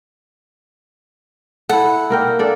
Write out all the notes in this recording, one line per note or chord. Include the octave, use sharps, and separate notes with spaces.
E4 A4 F#5
A#3 A#4 G5
D4 A4